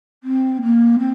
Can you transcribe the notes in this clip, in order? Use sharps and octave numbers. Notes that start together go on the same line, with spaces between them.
C4
A#3
C4